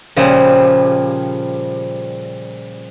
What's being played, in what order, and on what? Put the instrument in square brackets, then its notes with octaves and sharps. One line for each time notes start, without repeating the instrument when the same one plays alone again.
[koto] A#2 C#3 F3 G3